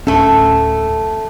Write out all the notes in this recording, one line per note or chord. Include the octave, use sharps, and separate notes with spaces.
D1 A3 C#4 A4